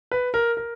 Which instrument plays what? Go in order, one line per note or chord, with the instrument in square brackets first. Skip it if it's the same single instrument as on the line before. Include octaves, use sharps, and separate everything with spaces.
[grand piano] B4
A#4
A#4